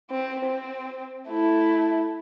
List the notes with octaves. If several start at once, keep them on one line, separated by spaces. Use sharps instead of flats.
C4
C4
A3 E4